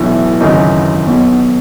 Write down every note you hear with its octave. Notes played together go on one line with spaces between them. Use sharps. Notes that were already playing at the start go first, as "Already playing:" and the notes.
Already playing: B1 A2 E3
G#1 F#2 C#3 E3 D#4
B1 B2